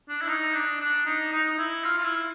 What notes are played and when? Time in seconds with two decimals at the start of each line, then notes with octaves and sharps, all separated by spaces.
0.09 D4
0.22 E4
0.28 D#4
0.55 D4
0.80 D4
1.06 D#4
1.32 D#4
1.49 D#4
1.58 E4
1.84 F4
1.98 F4
2.03 E4